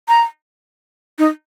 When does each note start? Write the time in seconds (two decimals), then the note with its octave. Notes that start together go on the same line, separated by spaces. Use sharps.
0.08 A#5
1.19 D#4